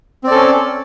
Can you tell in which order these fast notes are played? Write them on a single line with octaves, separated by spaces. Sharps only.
C4 D5 A4 C#4